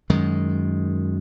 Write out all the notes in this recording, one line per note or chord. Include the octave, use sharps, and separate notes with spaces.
F#2 D#3 G#3